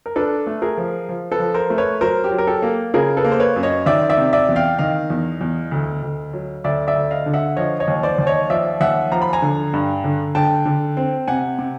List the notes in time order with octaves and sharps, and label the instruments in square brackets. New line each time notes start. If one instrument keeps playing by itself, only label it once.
[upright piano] A#4
D4 A4 B4
A3
G#4 A#4
F3
F3
A4 B4
F3
A#4 C5
A3
B4 C#5
F#3 A#4 C5
G4
F#3
A#4
G4 A4
A#3
C#3 G#4 A#4
A4 B4
A#3
C5
B4 C#5
F#2
C#5 D#5
D#3 D5 E5
D5 E5
C3
D5 E5
E2
F5 G5
D#3 D#5 F5
E2
E2
D2
D2
F#3
D2 D5 E5
D5 E5
D2
D#5 F5
D3
E5 F#5
F3 C#5 D#5
C#5 D#5
D#2
C5 D5
D#2
C#5 D#5
F3 D5 E5
D#2 E5 F#5
F3 A#5
B5
G#5 A#5
D3
G2
D3
D3 G5 A5
D3
C4
C3 F#5 G#5
C3